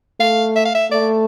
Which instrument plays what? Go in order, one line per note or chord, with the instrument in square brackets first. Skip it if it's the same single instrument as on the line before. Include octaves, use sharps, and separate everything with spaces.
[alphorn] A3 [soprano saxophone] F5
[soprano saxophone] E5
F5
E5
[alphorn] A3 [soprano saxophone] D5